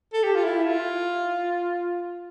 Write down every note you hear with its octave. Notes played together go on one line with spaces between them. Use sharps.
A4
G4
F4
E4
F4